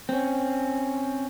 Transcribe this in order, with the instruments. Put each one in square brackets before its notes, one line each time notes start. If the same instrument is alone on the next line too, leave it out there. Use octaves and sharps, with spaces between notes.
[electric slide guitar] C4 C#4